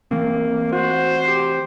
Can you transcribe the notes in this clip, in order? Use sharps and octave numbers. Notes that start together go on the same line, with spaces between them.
E3 A3 A#3 C4
F#4 C5
G4